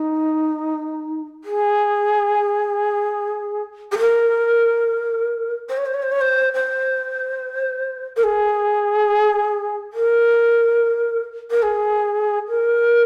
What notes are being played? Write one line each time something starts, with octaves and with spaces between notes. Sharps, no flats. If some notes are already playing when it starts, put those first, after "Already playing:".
Already playing: D#4
G#4
G#4
A#4
C5
C#5
C5
C#5
C5
C#5
C5
C5
A#4
G#4
A#4
A#4
G#4
A#4